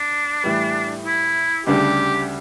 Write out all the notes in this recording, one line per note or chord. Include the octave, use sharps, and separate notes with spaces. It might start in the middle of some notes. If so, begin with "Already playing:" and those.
Already playing: D4
A2 E3 G3
E4
D2 C#3 G3 D4 G4